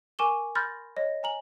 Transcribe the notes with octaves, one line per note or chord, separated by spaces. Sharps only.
A#4 G#5 C#6 D6 E7 G7
B5 C6 F6 G6 A6 A#6
C#5 D#5 A#6
G#5 A#5 F#7